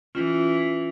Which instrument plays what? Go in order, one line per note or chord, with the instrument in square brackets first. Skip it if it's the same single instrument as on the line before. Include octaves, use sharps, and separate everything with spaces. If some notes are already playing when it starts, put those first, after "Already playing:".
[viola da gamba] E3 [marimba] C#4 F4